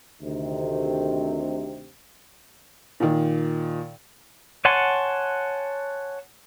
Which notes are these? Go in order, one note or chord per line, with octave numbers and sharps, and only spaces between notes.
D2 C3 D#3
A#2 D#3
C#5 F#5 G#5 A5 C6